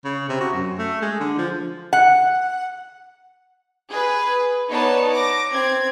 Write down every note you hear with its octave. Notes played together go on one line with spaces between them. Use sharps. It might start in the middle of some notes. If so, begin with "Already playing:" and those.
C#3
C3
F#4
F#2
A3
G#3
D3
F3
F#5
G#4 B4
B3 D#4 B4 C#5 D5 A5
D6 A#6
C4 G#6